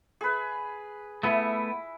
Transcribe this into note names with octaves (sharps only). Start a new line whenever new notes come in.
G#4 B4
A3 B3 E4